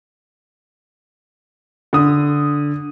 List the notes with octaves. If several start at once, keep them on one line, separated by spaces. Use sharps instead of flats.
D3 D#6